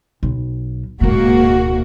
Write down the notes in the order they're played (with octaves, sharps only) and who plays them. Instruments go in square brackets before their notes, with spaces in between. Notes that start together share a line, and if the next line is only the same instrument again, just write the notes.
[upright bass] B1
[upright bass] D1 B2 [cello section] G#2 A#3 F#4